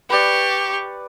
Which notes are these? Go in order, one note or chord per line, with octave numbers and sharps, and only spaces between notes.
G4 B4 D5 C#6